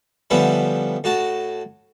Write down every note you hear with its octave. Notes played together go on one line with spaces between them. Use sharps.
D3 F3 G3 B3 C#4 E4
A2 F#4 A5